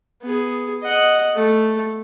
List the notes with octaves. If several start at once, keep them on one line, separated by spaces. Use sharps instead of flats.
B3 G#4
D#5 F#5
A3